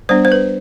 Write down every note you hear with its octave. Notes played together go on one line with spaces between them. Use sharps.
G3 B3 D4 C5
C5
B4